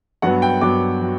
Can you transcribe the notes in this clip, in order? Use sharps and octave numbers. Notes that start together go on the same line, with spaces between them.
G2 F#3 B3 F#5
G5
G2 F#3 B3 D6
F#3